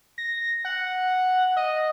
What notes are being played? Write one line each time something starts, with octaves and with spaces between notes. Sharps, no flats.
A#6
F#5
D#5